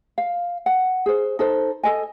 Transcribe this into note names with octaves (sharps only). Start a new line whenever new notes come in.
F5
F#5
G#4 C5
D#4 A4 C5
A4 D#5 G#5